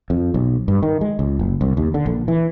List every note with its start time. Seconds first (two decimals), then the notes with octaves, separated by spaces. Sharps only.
0.10 F2
0.34 B1
0.68 G2
0.83 D#3
1.01 G#3
1.19 C#2
1.39 F#1
1.61 C2
1.77 D#2
1.94 D3
2.06 A#1
2.28 E3